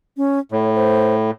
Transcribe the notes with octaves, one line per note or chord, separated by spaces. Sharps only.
C#4
A2 C#5
C5